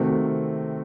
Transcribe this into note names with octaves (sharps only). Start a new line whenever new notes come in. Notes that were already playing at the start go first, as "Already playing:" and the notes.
Already playing: C3 D#3 A3 C4 F#4